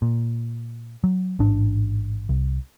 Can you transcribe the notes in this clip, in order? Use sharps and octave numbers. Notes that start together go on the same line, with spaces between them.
A#2
F#3
A1 G#2 D4
C2